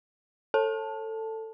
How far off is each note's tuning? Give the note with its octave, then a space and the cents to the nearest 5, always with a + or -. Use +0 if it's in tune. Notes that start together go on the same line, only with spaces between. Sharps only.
A4 +15 A5 +0